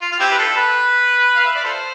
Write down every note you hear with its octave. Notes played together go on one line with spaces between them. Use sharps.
F4
F4
C4 E4 G4
B4
D4 F4 A4
B4
F5
E5
D5
F4 A4 C5